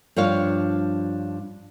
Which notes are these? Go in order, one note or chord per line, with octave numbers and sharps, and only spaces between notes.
G2 F3 D4 C#5 F5